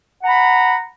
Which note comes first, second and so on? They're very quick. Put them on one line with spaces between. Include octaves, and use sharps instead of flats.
F#5 A#5 B5